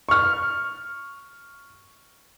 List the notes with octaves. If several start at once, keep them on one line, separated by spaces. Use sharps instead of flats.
C#6 F6